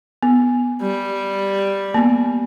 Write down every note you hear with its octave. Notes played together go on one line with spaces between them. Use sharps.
B3
G3
A#3 B3